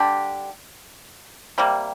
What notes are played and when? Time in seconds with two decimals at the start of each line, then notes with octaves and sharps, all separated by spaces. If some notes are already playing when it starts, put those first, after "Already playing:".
Already playing: D3 G3 D4 G4
1.58 C3 G3 A#3